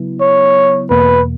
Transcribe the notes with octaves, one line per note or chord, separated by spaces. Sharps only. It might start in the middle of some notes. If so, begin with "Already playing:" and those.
Already playing: C#3 F#3 B3 E4
C#5
E2 B2 A#3 B4